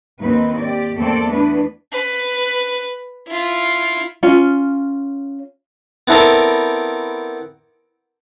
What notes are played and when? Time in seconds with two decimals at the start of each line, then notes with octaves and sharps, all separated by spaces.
0.20 D#2 C4 D#4 B4
0.58 G4 D5
0.96 E2 A3 A#3 C4 A4 D5
1.29 E3 A3 B3 D4 B4
1.92 B4
3.27 E4 F4
4.23 C#4 F4
6.08 B3 C4 E4 A4 A#4 D5